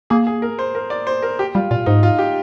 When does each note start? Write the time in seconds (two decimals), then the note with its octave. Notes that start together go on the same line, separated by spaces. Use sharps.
0.10 A#3 G#4
0.27 G#4
0.42 A#4
0.59 C5
0.75 A#4
0.90 D5
1.07 C5
1.22 A#4
1.39 G4
1.55 G3 F4
1.71 A#2 F4
1.86 G#2 D#4
2.03 F4
2.19 G4